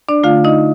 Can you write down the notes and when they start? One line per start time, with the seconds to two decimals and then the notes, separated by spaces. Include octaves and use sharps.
0.09 D4 D5
0.23 D3 A3 F4 F5
0.44 D#4 D#5